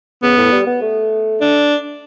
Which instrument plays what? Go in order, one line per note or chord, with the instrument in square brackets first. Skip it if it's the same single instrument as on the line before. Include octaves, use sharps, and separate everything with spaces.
[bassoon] C#3 [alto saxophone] B3
[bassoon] A2
G3
B3
A3
[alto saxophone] D4